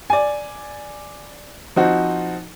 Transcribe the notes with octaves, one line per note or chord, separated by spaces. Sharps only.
D5 G#5
F3 C4 D#4 F#4